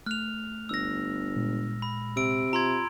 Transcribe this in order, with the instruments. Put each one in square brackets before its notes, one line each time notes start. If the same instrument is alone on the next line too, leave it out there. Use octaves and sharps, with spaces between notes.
[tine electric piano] A3 F#6 [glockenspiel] F6 F7
[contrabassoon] G1 [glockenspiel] E6 A#6
[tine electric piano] A#2 G#3
[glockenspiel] B5
[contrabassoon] C3 [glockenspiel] E6 D7
[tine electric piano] F4 [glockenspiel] A#5 C6 G#6